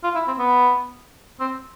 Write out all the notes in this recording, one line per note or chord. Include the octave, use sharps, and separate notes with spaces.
F4
E4
C4
B3
C4